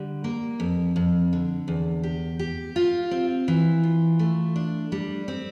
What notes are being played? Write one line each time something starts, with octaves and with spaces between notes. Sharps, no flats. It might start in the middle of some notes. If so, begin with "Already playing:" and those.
Already playing: D3 G3
A#3
F2
F2
D3
E2
G4
G4
F4
C4
E3
F4
A3
D4
G3
C4